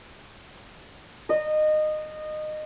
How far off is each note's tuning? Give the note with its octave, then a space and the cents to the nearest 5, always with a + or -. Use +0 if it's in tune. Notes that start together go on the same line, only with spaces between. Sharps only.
D#5 -20